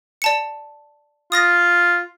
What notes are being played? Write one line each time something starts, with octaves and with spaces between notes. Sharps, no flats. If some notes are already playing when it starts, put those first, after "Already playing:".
D5 A5 C#7
F4 D#6 A6 A#6